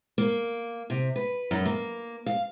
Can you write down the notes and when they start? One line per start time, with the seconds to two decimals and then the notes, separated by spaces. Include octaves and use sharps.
0.18 A#3
0.90 C3
1.16 B4
1.51 F#2
1.66 A#3
2.26 F5